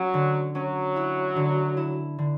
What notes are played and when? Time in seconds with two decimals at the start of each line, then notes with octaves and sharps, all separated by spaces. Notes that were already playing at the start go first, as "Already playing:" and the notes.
Already playing: F#3 C#4
0.14 D3
0.55 F#3 C#4
0.96 E4
1.36 D3
1.77 E4
2.18 D3